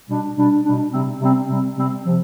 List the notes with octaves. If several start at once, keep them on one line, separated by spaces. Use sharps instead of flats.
B2 G3 D4
B2 G3 D4
B2 G3 D4
C3 G3 C4
C3 G3 C4
C3 G3 C4
C3 G3 C4
C3 F3